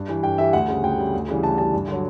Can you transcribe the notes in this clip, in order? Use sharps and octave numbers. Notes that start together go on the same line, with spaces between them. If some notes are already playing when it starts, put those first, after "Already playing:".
Already playing: G2
E3 G3
G2 G5
E3 G3 E5
D2 F#5
C#3 G3
D2 G5
C#3 G3
D2
C#3 E3 G3
D2 A5
C#3 E3 G3 A5
G2
D3 F#3